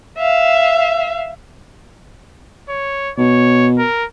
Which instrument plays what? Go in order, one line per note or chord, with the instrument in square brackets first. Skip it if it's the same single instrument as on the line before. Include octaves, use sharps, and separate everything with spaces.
[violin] E5 F5
[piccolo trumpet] C#5
[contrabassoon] B2 [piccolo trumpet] C#5
[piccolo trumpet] A#4